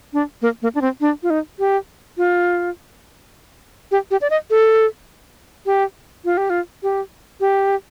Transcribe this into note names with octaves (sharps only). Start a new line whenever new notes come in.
D4
A#3
A#3
D4
C4
D4
F4
D#4
G4
F4
G4
G4
D5
D#5
A4
G4
F4
G4
F4
G4
G4